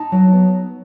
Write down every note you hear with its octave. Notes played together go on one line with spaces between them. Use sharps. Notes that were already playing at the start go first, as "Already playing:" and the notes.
Already playing: D#4 A5
F#3
B3